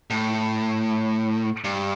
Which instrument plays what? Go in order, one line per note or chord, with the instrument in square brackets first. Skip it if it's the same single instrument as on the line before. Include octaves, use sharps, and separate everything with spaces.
[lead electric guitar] A2
G2